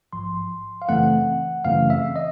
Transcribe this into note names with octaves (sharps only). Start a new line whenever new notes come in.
A#1 G#2 F3 C6
F5
F#2 C#3 E3 A3 C4 F#5
F#2 C#3 E3 A3 C4 F5
E5
D#5